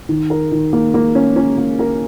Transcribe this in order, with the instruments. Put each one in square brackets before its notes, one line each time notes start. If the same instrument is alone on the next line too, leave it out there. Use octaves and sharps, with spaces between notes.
[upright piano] D#3
A#4
D#3
A#3
A#3
C#4
C#4
A#3
A#4